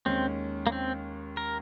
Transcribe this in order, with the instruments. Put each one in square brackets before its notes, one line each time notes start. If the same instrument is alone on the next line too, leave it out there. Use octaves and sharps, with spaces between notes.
[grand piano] D#2 D#3 G#3 C#4 [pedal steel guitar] C4
[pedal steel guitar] A#3
C4
A#4